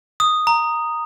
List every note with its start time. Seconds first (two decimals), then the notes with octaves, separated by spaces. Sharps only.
0.20 D#6
0.47 A#5